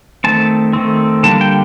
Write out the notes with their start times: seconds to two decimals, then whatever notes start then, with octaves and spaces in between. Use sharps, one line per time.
0.24 D#3 A3 C4 A5
0.73 D#3 A3 C4
1.23 D3 G3 A#3 A5
1.41 G5